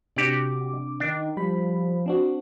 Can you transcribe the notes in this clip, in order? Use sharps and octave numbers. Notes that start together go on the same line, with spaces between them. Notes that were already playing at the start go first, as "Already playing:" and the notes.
C3 D4 F#4 G4 D5 D6
D#3 D4
F3 G3 B5
C4 D4 F#4